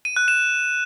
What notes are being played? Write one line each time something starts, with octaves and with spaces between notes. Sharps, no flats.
D#7
F#6
E7